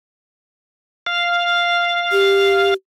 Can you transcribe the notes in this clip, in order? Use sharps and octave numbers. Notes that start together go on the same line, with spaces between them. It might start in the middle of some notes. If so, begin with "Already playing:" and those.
F5
G4